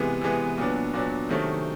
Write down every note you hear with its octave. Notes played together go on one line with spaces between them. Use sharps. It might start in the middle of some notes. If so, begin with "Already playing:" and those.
Already playing: C3 E3 G#3 B3
C3 E3 G#3 B3
A#2 F#3 B3 D4
A#2 F#3 B3 D4
C3 D#3 F#3 A3 C4